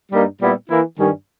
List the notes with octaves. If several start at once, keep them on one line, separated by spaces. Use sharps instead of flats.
G2 G3 A#3 D#4
A#2 G3 B3 E4
E3 A#3 E4
G2 D#3 G3 C#4